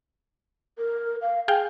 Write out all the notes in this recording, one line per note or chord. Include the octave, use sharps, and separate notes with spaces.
A#4
F5
G#4 F5 G5 G#5